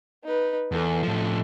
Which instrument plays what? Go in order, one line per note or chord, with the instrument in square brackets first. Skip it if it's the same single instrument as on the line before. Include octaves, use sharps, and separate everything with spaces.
[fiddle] D#4 B4
[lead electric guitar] E2 [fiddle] A4
[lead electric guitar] A2 F3